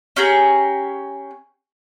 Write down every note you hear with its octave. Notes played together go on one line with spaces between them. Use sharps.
C#4 G4 G#4 A#5